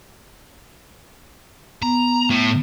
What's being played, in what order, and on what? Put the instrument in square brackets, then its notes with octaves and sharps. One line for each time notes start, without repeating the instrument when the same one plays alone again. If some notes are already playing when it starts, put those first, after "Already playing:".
[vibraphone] B3 [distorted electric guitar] A#5
[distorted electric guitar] A2